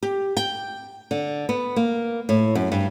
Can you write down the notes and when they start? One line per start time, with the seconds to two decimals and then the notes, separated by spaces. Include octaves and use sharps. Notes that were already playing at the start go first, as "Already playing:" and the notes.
0.03 G4
0.37 G5
1.11 D3
1.49 B3
1.76 A#3
2.29 A2
2.55 F#2
2.72 G2